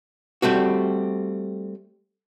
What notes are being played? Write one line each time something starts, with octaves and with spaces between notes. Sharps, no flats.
G3 A3 C4 F#4